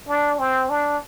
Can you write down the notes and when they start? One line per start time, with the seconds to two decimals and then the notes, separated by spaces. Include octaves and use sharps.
0.08 D4
0.39 C4
0.70 D4